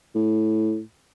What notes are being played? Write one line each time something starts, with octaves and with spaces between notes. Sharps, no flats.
A2